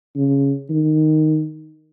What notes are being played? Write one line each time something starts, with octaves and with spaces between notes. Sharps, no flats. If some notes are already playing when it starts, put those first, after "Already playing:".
C#3
D#3